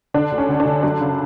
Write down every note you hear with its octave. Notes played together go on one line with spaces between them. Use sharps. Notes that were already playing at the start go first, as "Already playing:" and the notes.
D3 D4
D2
C#4
D2
D4
D3
F#2 D4
C#3